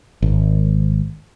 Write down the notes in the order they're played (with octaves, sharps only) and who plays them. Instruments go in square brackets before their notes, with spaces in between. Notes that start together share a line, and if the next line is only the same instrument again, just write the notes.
[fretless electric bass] G#1